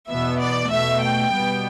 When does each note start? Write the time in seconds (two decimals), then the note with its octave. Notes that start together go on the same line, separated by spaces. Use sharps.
0.09 E2 B2 B3 E5
0.40 D5
0.72 B2 A3 E5
1.02 G5
1.32 B2 G3 B3